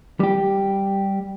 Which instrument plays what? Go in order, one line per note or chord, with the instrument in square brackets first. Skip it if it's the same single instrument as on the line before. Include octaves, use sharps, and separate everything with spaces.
[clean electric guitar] G3 G4